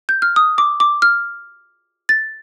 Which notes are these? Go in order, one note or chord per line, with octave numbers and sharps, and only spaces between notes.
G6
F6
D#6
D6
D6
F6
A6